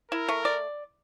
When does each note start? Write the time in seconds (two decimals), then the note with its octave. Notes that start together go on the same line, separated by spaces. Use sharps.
0.11 E4 A#4
0.28 A3
0.45 D5